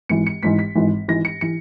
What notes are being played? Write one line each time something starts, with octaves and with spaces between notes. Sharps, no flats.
G#1 G#2 E3 C#7
C#7
G#1 G#2 E3 B6
B6
G#1 G#2 E3
G#1 G#2 E3 A#6
C#7
E3 C#7